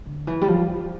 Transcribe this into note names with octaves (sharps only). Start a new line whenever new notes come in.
D3
E3
G3
F3
F3